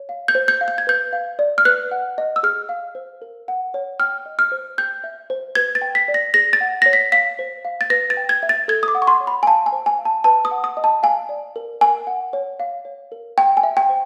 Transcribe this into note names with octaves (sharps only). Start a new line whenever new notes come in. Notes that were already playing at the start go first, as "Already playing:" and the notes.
Already playing: C#5
F5
G6
C5
G6
F5
G6
G#6
B4 G6
F5
D5
F6
B4 F#6
F#5
D#5
E6
G#4 F6
F5
C5
A#4
F#5
C#5
G5 F6
D#5
F6
C5
G5 G6
E5
C5
B4 G#6
A6
G5
B6
D5
A#6
G#4 A#6
A6
F#5
C#5 A#6
B6
F5 B6
C5
F5
A6
B4 A#6
A6
G5
G#6
E5
A6
A4 G#6
D#6
D6
F#5
C#6
C6
C#5
B5
G#5
F5 A5
G#5
C5
G#5
F5
A5
B4 A5
D#6
F#5
D#6
D#5
A5
F5 G#5
D5
A#4
A#4 G#5
F#5
C#5
F5
C#5
A#4
G5
G#5
E5
G5
C5